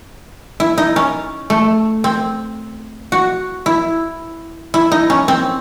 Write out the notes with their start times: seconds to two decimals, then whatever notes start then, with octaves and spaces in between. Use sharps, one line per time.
0.60 E4
0.78 D#4
0.96 C#4
1.50 A3
2.04 C4
3.12 F#4
3.66 E4
4.74 E4
4.92 D#4
5.10 C#4
5.28 C4